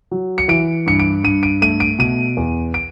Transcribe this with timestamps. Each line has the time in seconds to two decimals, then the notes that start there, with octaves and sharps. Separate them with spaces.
0.11 F#3
0.38 C#7
0.48 E3 D7
0.86 G2 C#7
0.99 D7
1.24 G2 D#7
1.43 D7
1.62 A3 D#7
1.80 D7
1.99 B2 D#7
2.37 E2
2.74 D7